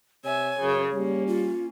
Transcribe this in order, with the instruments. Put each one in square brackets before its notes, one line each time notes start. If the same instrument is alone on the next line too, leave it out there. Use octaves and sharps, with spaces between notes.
[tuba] C3 [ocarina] C#5 [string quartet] E5 G#5
[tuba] F#2 [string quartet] C#3
[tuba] G3 [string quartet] A#3 C#4
[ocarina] F4